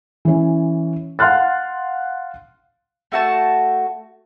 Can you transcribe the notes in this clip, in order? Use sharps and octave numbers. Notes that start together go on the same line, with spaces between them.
E3 C#4
F5 F#5 C6 F6 F#6 A6
A3 F#4 A5